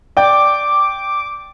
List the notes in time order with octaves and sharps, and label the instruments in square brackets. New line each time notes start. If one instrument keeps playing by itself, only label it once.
[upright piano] D5 G5 [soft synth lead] D6